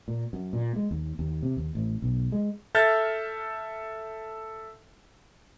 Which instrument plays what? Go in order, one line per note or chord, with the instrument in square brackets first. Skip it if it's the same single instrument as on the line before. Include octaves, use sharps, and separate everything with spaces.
[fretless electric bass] A#2
F#2
A#2
G#3
D#2
D#2
C3
D#2
A1
B1
G#3
[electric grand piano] A4 E5 F6 G6 A6